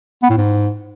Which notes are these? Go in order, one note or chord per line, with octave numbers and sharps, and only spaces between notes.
B3
A2
G#2